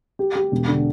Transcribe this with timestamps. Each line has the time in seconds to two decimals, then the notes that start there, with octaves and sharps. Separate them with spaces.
0.19 G4
0.35 G4
0.52 E1
0.68 D3